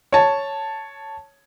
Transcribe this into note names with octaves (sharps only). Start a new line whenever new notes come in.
C#5 A5